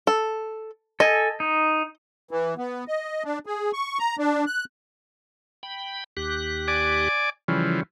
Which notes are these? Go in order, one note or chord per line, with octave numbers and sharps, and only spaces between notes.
A4
A4 D#5 G#5
D#4
E3
B3
D#5
D4
G#4
C#6
A#5
D4
F#6
G5 B5
D#2 G4 F#6
D5 G#5 D6
C#3 E3 F3 G3 C#4